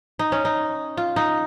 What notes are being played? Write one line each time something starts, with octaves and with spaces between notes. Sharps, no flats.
D#4
C#4
D#4
F4
D#4